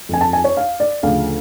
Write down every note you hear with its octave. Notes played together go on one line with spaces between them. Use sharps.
F2 F3 G#5
A5
G#5
C#5
F5
D5
D2 C#3 F3 F5